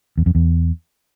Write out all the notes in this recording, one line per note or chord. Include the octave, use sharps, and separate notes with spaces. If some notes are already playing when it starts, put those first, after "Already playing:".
E2
F2
E2